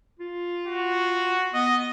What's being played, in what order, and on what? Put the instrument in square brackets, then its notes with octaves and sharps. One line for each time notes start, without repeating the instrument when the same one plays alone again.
[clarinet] F4
[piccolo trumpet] F#4
[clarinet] B3 [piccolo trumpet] D#5